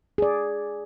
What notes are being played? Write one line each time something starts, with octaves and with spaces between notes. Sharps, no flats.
G#4 D5